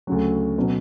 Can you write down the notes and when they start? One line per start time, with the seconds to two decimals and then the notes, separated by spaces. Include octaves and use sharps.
0.07 D2 C#3 F#3
0.58 B2 F#3 C#4